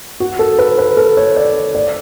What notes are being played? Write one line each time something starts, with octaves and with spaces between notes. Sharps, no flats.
F#4
A4
B4
B4
A4
C#5
D5
D5